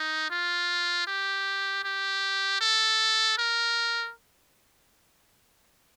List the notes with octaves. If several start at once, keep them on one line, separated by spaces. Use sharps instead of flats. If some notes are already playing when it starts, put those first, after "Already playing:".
Already playing: D#4
F4
G4
G4
A4
A#4